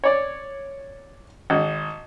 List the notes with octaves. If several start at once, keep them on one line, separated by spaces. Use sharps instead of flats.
C#5 D5
G#1